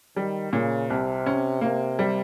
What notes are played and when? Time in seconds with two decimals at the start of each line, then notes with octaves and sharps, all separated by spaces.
0.16 D#3 G3
0.53 A#2 C#3
0.89 C2 C3
1.26 C#4
1.61 C3 A#3
1.99 G3